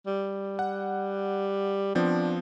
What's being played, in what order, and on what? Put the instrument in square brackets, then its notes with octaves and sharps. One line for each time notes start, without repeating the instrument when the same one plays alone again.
[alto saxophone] G3
[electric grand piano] F#5
[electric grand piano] F3 B3 C4 [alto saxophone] D4